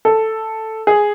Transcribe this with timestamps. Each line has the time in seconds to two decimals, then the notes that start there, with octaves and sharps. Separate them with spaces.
0.05 A4
0.87 G#4